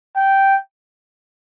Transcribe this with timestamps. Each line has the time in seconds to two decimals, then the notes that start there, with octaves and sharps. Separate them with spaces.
0.17 G5